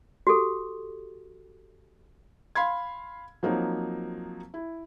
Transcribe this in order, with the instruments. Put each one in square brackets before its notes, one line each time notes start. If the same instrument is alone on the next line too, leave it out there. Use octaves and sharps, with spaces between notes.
[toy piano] F#4 G4 A4
[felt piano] F5 B5 C6 G#6
F3 F#3 A#3 C4 D#4
E4